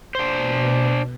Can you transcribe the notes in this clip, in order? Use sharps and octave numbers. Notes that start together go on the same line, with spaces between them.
B2 D4 C5